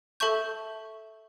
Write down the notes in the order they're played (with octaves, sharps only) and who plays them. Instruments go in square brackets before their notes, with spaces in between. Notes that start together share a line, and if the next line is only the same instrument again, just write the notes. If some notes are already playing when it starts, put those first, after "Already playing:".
[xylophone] A4 E5 A5 C#6 G6